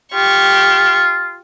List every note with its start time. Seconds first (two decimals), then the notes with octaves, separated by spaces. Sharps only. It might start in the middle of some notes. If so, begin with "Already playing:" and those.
0.14 F4 G4 C#6